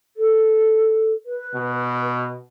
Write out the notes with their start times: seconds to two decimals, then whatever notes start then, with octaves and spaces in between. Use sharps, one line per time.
0.17 A4
1.26 B4
1.55 B2